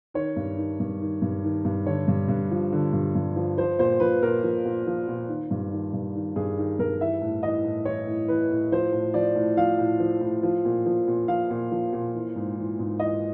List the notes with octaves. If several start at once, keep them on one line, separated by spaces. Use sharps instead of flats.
D#3 C#5
G2
D#3
G2
D#3
G2
D#3
G2
D3 C#5
G2
G2
F3
D3
G2
G2
F3
F3 C5
A#2 C5
F3 B4
A#2 A#4
F3
A#2
F3
A#2
D#3
G2
D#3
G2
D#3
G2 G#4
D#3
G2 A#4
E3 E5
A2
E3 D#5
A2
E3 C#5
A2
E3 B4
A2
F3 C5
A2
F3 D5
A2
F3 F5
A2
F3
A2
F3
A#2
F3
A#2
F3 F5
A#2
F3
A#2
E3
G#2
E3
G#2
E3 D#5